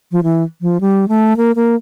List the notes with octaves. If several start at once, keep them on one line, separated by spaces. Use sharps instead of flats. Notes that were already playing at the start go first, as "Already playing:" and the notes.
F3
E3
F3
G3
A3
A#3
A#3